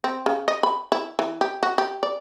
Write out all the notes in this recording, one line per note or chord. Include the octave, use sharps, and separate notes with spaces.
C4
C#3
D#5
B5
E4
E3
G4
F#4
G4
D5